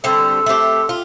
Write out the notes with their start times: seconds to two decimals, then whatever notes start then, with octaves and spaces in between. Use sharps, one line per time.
0.04 D3 G3 C4 A4
0.46 A3 C4 G4
0.89 F4